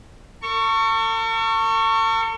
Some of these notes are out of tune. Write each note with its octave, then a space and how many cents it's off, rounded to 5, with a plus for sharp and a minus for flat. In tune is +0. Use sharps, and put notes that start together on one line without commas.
A4 +45 C#6 +0